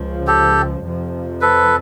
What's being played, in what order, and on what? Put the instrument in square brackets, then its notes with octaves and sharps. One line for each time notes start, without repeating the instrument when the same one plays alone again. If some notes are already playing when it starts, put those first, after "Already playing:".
Already playing: [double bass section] C#2 C#3 F3
[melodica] G4 A4
[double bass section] F2 C3 F3
[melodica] A4 B4